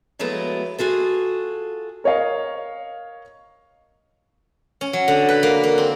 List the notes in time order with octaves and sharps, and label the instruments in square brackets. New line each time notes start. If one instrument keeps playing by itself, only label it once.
[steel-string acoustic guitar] F3 F#3 G#3 A3 B3 E4
F4 F#4 G#4 A4
[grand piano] A#4 C#5 D#5 F5
[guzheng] C#4
F#3
D3
B4
A#3
A#3
C4